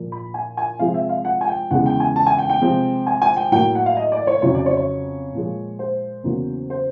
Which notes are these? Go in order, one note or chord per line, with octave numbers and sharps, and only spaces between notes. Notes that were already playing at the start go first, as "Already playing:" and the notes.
Already playing: A#2 F3 A#3
B5
G#5
G#5
C3 F3 G#3 C4 F5
E5
F5
F#5
G#5
G5
E2 C#3 E3 G#3 F#5
G5
G#5
A5
G#5
G5
G5
C3 F3 G#3 C4
G#5
G#5
G5
A2 F#3 A#3 G5
F#5
F5
D#5
D5
C#5
F2 C#3 F#3 C#5
D5
C#5
C#5
A#2 F3 G#3
C5
E2 C#3 F#3 A#3
C5